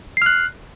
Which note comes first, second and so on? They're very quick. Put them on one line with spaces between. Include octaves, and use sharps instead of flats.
C7 F6 F#6